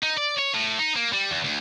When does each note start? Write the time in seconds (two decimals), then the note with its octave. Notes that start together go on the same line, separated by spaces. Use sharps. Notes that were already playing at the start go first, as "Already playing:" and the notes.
0.03 D#4
0.17 D5
0.38 C#5
0.54 A2
0.79 D#4
0.96 A#3
1.13 G3
1.31 E2
1.44 D2